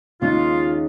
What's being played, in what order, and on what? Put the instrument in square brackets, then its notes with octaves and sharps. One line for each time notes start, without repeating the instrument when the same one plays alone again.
[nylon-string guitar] D#2 C#3 G#3 D#4 [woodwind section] F4